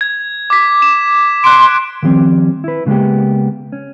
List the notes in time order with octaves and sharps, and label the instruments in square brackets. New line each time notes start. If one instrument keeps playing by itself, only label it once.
[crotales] G#6
D6 B6
E7
[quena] C6 [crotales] F#6 D7
[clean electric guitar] D#3 F3 G3 C4 C#4
E4 B4
C#3 G#3 A#3 B3 G4
C#4